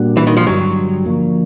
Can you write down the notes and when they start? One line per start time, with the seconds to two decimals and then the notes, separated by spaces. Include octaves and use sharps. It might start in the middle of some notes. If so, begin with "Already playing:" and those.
Already playing: A#2 G3 A#3 D4 F#4
0.17 E3
0.27 D#3
0.37 F3
0.46 G2 D3 F#3 G3
1.06 D3 F3 A#3